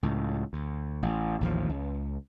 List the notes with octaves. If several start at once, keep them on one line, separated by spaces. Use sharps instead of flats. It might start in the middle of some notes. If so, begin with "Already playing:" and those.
C#2 A2
D2
A1
A1 D#2 F3
C#2